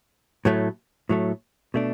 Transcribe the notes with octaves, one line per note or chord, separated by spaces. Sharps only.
A2 F#3 A3
A2 F#3 A3
B2 A3 D4